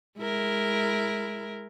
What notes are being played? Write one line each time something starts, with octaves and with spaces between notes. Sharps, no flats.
G#3 E4 A#4